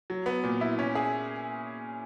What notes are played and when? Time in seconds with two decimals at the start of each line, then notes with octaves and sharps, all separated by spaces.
0.10 F#3
0.26 B3
0.44 A#2
0.61 E4
0.79 C#4
0.95 G#4